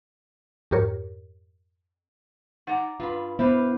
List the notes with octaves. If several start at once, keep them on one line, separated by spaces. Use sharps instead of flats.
F2 G#2 G4 A#4 C#5
D#4 D5 F#5 A#5
G2 F4 B5
B3 E4 G4 B4 C5 F5